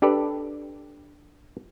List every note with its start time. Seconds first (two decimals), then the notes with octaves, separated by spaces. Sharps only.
0.02 D4 G4 A4 B4 D5